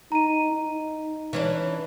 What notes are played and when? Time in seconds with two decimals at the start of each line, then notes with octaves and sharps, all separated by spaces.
0.12 D#4 A#5 D#7
0.53 D#4
1.33 E3 C#4 D4